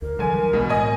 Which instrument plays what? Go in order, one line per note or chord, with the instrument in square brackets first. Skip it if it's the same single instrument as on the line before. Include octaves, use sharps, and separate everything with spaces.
[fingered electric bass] D2 [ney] A#4
[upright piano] D3 G#5 [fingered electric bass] E3 F#3 G3
[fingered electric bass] B1 G#3 [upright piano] B2
[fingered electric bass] A2 [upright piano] D#5 G#5